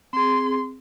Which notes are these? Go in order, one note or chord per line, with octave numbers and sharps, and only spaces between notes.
C4 G#4 C6